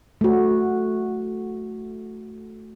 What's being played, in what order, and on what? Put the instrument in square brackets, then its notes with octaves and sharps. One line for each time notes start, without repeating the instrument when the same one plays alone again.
[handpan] A3 F#4